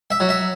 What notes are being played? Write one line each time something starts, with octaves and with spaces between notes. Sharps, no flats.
E5
F#3
E5